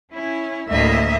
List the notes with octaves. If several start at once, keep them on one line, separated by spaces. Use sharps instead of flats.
C#4 E4
D2 A2 A#3 D#5 E5